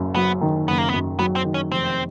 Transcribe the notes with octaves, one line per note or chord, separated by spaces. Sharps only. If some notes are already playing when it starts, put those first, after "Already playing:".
Already playing: F#1 F#2
F#3 B3
D#3
F#1 B3
A#3
B3
F#2
F#3 B3
C4
D#3
C#4
F1 C4